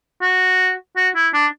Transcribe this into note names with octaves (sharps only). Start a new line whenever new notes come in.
F#4
F#4
E4
D4